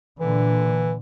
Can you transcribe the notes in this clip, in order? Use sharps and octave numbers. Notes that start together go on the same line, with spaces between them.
A#2 D3 E3